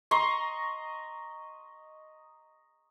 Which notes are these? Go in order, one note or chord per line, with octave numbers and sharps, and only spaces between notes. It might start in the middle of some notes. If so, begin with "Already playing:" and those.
D#5 A#5 C6 C#6